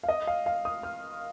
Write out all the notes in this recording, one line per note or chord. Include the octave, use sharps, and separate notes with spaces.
F5
D#5
F5
F5
D#6
F6